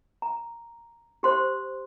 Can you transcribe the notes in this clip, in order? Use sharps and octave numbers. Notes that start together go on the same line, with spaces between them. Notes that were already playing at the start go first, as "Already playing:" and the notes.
A#5
G4 C5 C6